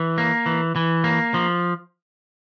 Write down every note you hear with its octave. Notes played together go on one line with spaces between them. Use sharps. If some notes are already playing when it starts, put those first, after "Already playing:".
Already playing: E3
A#3
E3
E3
A#3
F3